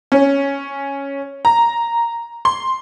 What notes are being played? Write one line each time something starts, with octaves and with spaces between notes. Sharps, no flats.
C#4
A#5
C6